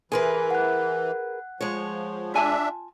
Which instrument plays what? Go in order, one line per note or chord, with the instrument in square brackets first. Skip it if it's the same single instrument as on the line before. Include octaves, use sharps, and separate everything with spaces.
[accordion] E3 [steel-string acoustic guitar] G#4 A#4 B4 [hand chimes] G#5 C6
[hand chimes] F#5 F#6
[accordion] F3 [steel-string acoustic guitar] G#3 C#5
[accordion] D4 E5 [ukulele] F4 G#5 A5